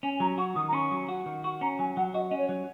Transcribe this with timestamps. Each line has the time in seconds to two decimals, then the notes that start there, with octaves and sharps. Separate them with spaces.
0.03 C#4 G#5
0.20 F#3 A#5
0.38 F#4 C#6
0.55 D#3 D#6
0.68 A#5
0.73 C#4 C#6
0.91 F#3
1.08 F#4
1.26 D#3
1.44 F#4 C#6
1.61 C#4 A#5
1.79 F#3 G#5
1.97 F#3 F#5
2.14 F#4 D#5
2.30 C#4 D#5
2.37 C#5
2.49 F#3